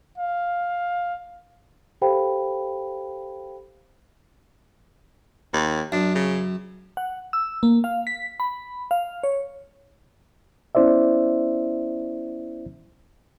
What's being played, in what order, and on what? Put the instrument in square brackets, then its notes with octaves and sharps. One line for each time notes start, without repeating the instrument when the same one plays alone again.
[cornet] F5
[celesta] G4 A4 C5 F5 G5 B5
[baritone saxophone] D#2
[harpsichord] F#2 [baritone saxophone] D4
[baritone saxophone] C#3
[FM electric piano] F#5
E6
A#3
F5
B6
B5
F5
C#5
[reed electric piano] B3 C#4 E4 C5 D5 E5